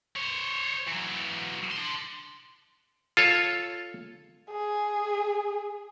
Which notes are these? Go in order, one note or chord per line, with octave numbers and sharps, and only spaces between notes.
C5 C#5
E3 F#3
D4 C6
F4 A4 C#5
G#4